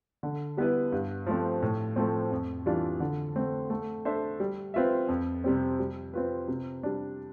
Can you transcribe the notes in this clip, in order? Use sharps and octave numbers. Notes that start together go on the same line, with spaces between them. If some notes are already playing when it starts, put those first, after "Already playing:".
D3
G3 B3 E4 B4
G2
F3 A3 C4
A2
F3 A3 C4
F2
E3 G3 D4 F4
D3
A3 C4
A3
D4 A4 C5 E5
G3
C4 F4 B4 E5
F2
C3 G3 C4
G3
C4 F4 B4
C3
G3 D4